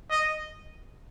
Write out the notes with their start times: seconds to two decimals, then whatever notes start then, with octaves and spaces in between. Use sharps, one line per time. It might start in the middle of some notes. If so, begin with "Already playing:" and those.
0.11 D#5